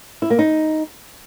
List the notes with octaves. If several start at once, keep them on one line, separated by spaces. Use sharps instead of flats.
E4
A#3
D#4